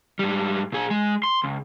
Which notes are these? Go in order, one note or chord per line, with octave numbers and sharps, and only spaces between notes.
G#2 G3
A#2 G#4
G#3
C6
C#2